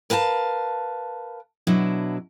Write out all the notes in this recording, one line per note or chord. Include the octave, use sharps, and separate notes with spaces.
A#4 B4 F5 F#5 A5
B2 F#3 D4 E4